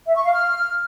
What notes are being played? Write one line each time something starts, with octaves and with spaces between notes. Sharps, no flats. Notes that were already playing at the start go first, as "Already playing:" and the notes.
E5
C#6
F5
F6